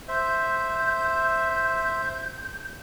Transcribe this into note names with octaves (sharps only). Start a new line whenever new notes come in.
C5 E5 G6